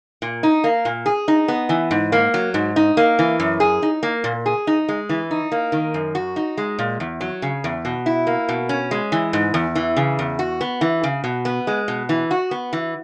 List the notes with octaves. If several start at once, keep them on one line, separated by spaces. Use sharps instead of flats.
A#2
D#4
A#3
A#2
G#4
D#4
B3
E3
G#2
A#3
F#3
G#2
D#4
A#3
E3
F#2
G#4
D#4
A#3
A#2
G#4
D#4
G#3
E3
D#4
A#3
D#3
F#2
F#4
D#4
G#3
A#2
E2
F#3
C#3
E2
B2
E4
A#3
B2
C#4
G#3
E3
G#2
E2
E3
C#3
E2
F#4
B3
E3
C#3
B2
B3
G#3
B2
E3
F#4
B3
E3